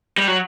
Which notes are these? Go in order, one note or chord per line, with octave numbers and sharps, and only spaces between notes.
G3
F#3